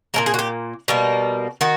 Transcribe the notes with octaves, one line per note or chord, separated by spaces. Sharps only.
A#2 F3 A#3 A#4
G#4
F#4
G4
B2 G3 A#3
D#3 F#4